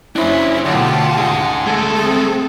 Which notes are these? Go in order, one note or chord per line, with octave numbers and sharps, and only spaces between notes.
F#1 C#4 D4 E4 C5
D2 B2 D#3 F#3 F4 G4 F#5 A5
D2 C#3 D#4 G#4
G#3 A3 A4
C4 G#4